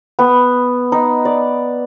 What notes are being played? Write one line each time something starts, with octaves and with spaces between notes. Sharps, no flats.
B3
D#4
D5